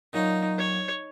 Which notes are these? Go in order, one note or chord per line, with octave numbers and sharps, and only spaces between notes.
A#2 F#3 C#4 D#4 F4
C#5